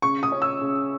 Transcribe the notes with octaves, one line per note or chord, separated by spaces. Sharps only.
C#3 C#6
D#6
C#4
E6
C#3